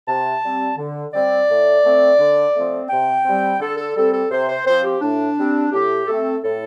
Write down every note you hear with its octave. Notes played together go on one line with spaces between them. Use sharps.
C3 A5
G3 C4
D3
G3 C4 D5
A2
A3 C4
D3
F3 A3 C4
C3 G5
G3 C4
D3 A4
A4
G3 C4 A4
A4
C3 C5
C5
F3 C4 C5
G4
A2 D4
G3 C4
A2 G4
A3 C4 A4
A2 A4